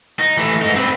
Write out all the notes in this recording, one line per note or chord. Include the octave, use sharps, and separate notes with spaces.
D#4
E3 A3
G#2 D#4
C4 B4